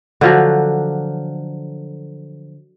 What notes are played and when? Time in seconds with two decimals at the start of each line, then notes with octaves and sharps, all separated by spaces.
0.21 D3 F3 F#3